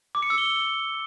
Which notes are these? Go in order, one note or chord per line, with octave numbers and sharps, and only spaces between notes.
D6
C#7
E6
G7